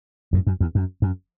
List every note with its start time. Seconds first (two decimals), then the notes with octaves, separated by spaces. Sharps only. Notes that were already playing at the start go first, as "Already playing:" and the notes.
0.33 F#2 A2
0.47 F#2
0.60 E2
0.75 F#2
1.02 F#2